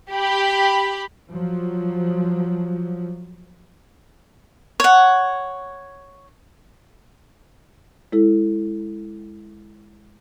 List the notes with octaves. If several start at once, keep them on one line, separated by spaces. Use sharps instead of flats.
G4 B5
F3 F#3
C#5 F#5
G#3 E4 A4